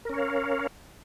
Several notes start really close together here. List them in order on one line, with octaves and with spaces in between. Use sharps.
A#4 C#4 C#5 F5